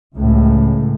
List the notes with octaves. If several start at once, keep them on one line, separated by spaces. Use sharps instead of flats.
C#2 A2